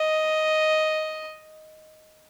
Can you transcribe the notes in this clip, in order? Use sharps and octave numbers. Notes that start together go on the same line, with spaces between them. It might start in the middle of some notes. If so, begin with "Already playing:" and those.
Already playing: D#5